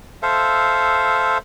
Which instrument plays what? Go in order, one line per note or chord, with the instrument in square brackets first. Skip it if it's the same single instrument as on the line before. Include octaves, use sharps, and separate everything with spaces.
[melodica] A4 C5 E5 F5